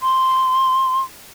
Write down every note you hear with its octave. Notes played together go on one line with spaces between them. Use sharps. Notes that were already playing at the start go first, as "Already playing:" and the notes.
C6